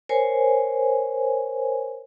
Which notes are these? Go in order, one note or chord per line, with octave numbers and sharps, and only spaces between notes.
A#4 C5 C#5 G#5